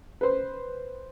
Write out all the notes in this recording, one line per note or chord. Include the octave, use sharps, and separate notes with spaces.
B4 C5